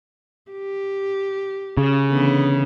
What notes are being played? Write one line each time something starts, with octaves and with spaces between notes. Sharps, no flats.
G4
C#3
D3 E3 B3